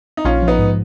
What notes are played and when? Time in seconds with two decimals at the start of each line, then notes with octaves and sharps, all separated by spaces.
0.17 D#4
0.25 A#1 C#4 F4
0.42 F3
0.48 B3 D#4
0.59 G#2